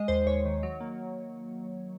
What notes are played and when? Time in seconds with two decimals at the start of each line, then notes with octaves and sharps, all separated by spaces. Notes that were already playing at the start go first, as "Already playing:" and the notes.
Already playing: G#3 D#5
0.08 D#2 C5
0.26 D#2 C#5
0.45 D#3
0.63 F#3
0.80 A#3